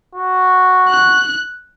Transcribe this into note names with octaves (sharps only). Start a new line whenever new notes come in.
F#4
F#6